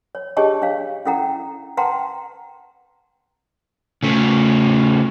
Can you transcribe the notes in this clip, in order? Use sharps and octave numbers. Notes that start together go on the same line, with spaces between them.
C#5
D4 G4 G#4 C#5 D#5 A5
D4 C#5 F5
C#4 E4 A4 F#5 G5 A#5
B4 F#5 G5 A5 A#5 C6
C#3 A3